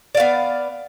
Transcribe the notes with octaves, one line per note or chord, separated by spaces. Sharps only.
B3 D5 F5